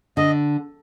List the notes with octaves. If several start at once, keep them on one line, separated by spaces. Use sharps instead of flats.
D3 D#5